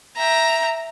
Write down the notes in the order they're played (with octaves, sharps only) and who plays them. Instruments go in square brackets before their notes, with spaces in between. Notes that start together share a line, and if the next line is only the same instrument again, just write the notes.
[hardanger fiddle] E5 G5 [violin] A#5